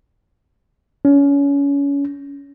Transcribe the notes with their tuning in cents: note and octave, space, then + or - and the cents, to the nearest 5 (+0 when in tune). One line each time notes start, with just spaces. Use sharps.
C#4 +25